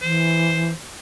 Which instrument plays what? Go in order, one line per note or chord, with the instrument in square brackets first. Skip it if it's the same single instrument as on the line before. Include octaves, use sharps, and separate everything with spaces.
[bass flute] E3 [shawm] C5